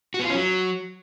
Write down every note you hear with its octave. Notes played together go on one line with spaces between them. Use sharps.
F#4
B3
F4
C#4
F#3